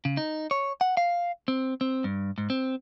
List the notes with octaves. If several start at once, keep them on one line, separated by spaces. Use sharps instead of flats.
C#3
D#4
C#5
F#5
F5
C4
C4
G2
G#2
C4